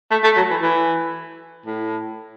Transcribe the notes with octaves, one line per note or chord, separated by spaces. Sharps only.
A3
A3
F#3
E3
E3
A2